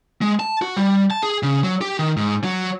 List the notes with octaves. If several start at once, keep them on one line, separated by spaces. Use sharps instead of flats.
G#3
A5
F#4
G3
A5
G#4
C#3
F#3
G4
D#3
G#2
F#3